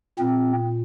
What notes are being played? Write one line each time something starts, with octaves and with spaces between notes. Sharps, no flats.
A#2 C4